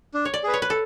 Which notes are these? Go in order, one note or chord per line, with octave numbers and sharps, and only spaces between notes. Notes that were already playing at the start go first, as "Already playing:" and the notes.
D4
C#5
D5
G#4 B4
C#5
B4
A4